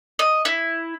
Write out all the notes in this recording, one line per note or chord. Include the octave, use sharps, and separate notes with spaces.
D#5
E4